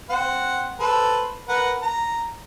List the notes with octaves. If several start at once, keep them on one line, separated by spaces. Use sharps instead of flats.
C4 C5 F#5
A4 B4 C5
A#4 B4 F#5
A#5